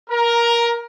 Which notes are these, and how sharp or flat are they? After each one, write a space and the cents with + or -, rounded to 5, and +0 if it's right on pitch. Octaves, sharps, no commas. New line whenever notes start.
A#4 +15 A#5 +0